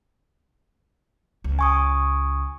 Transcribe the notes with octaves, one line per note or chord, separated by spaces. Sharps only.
C#2
G#5 C#6 D#6